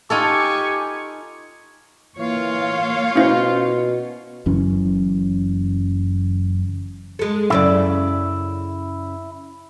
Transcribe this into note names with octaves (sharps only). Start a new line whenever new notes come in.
D#4 F4 G4 A4 G#5 C#6
E3 A#3 F4 C#5 F5
B2 C#4 E4 C5
F#1 F#2 E3 C#4
G#3 A4
F#2 C#3 E4 D5